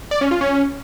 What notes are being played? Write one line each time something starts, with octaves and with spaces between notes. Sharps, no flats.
D5
C#4
F4
C#4